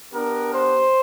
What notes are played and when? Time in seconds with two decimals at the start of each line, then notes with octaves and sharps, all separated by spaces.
0.11 B3 D4 G4 A#4
0.52 C5